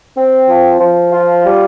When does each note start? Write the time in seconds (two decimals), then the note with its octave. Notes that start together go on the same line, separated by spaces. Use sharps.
0.17 C4
0.49 F3
0.80 F3
1.13 F4
1.44 G3